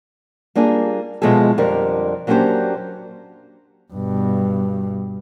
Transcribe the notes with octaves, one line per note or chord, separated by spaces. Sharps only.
G3 A#3 D4 F4 G#4
B2 F3 G#3 E4 G#4 A4
F2 D3 G3 G4 A#4
F#3 A#3 C#4 D4 G4 C5
G2 B2